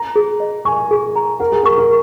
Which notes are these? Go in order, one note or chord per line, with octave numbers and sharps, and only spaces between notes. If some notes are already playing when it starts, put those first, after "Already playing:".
Already playing: A#5
G#4
D#5
G#5 C#6
G#4
A#5
A#4 F#5
G#4
A#4
C#6
A#4